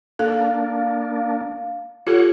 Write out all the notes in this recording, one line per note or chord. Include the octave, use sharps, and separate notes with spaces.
A#3 D4 A4 F5
F4 G4 A4 C#5 F#5